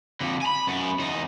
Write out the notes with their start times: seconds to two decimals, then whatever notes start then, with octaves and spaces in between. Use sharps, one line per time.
0.21 F2 D3
0.42 G#5 B5
0.67 F#2 B3
0.99 E2 D#4